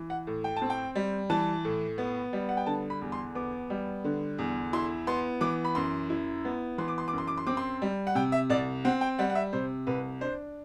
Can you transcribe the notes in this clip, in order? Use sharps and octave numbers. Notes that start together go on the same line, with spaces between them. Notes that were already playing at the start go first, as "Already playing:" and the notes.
Already playing: E3
F#5
A2
G5
A5
C4
G5
G3
E3 A5
A2
B3
G3
F#5
G5
D3 A5
B5
E2
C6
B3 D6
G3
D3
E2
E4 C6
B3 C6
E3 D6
B5
F#2 C6
E4
B3
E3 C6
D6
C6
D6
F#2 C6
D6
C6
C4 D6
C6
G3
F#5
C3 G5
E5
C2 D5
C4 F#5
G5
G3 F#5
F#5
E5
C3 C5
C2 B4
D4 C5